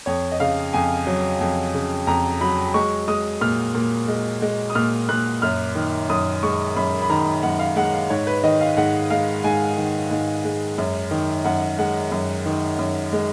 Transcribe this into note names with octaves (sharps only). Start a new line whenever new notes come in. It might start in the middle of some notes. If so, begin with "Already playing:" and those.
F2 C#5
D#5
C#3 F5
F2 G#5
F#3
F2
C#3
F2 A#5
F#3 B5
G#3 C#6
G#3 D#6
A#2 F6
A#2
G#3
G#3
D#6
A#2 F6
A#2 F#6
F#2 F6
D#3
F#2 D#6
G#3 C#6
F#2 B5
B5
D#3 A#5
F#2 F#5
F5
G#3 F#5
F5
G#2 C#5
B4
D#3 D#5
F5
G#2 F#5
G#3 F5
G#2 G#5
D#3
G#2
G#3
F#2
D#3
F#2 F#5
G#3 F#5
F#2
D#3
F#2
G#3